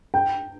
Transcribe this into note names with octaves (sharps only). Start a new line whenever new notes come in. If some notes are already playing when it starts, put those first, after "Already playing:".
G5